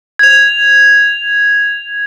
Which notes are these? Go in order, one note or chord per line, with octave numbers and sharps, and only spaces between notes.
G#6 F7